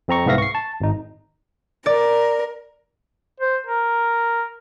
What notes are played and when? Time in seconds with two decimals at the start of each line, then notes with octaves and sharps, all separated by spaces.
0.08 F2 C4 A#5 C#6
0.26 C2 G#2 B3 E5 F5 A#6
0.38 C#6 C7
0.55 A5
0.81 G#1 D#4
1.86 A#4 D5
3.40 C5
3.67 A#4